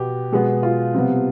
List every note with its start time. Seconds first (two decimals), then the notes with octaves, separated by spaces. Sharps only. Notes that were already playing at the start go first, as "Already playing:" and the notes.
Already playing: B2 B3 G4
0.32 B2 G#3 B3
0.63 F4
0.95 C3 G3 B3